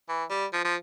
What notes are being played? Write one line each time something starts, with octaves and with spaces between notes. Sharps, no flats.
E3
G3
F3
F3